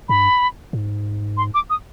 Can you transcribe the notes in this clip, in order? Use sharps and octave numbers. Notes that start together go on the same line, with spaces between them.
G2 B5
G#2
C6
D6
D#6